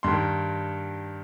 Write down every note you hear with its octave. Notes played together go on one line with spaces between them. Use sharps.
G2 D#3 C6